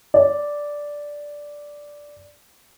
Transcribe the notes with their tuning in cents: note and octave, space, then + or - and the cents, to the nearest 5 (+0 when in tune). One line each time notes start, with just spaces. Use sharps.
D5 -5